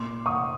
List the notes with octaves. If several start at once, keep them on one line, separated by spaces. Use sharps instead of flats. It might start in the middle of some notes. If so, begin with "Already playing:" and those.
Already playing: A#2 C6 D6
C#6 D#6